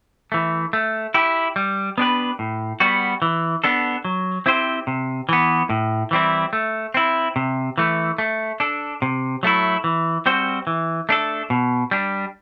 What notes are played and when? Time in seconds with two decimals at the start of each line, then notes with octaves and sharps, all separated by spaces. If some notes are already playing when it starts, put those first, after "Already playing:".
0.32 E3 A3
0.73 A3
1.14 E4 G4
1.56 G3
1.98 B3 D4 G4 B4
2.39 A2
2.80 G3 B3 F#4
3.22 E3
3.64 B3 D4 A4
4.05 F#3
4.46 C4 E4 G4 C5
4.87 C3
5.29 E3 B3
5.70 A2
6.11 E3 G3 C4 E4
6.53 A3
6.94 C4 E4
7.36 C3
7.78 E3 A3
8.18 A3
8.60 D4 A4
9.02 C3
9.43 F#3 A3 E4
9.84 E3
10.26 G3 C4 F#4 C5
10.67 E3
11.09 A3 D4 A4
11.50 B2
11.91 G3 D4